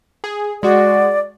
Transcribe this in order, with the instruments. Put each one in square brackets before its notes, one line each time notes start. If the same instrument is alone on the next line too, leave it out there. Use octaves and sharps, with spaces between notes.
[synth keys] G#4
[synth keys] G#3 F#4 [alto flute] D5